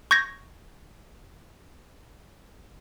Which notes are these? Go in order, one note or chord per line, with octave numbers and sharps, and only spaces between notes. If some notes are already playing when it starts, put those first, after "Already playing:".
C#6 G6 G#6 A#6